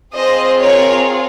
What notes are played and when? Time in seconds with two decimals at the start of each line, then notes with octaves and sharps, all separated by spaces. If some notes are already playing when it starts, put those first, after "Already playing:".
0.14 C4 F4 G#4 C5 D#5
0.61 A#4 C#5